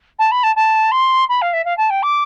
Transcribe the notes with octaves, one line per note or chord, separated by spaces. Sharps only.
A5
B5
A5
A5
C6
B5
F5
E5
F5
A5
G5
D6